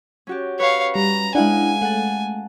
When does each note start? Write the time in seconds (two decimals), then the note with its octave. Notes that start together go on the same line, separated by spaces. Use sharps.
0.27 C#4 F#4 G4
0.60 B4 C#5 F5
0.95 G3 A#5
1.35 G#3 D4 E4 F5 F#5 G#5
1.82 A3 F#5 A5